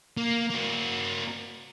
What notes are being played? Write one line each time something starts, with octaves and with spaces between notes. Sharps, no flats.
A#3
A#3 F#4